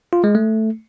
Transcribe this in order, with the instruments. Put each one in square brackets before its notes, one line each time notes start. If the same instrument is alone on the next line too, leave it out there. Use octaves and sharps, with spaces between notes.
[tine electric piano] F4
G#3
A3